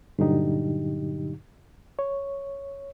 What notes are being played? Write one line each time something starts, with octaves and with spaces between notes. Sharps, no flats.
G2 A#2 D3 F#3 D#4 G4
C#5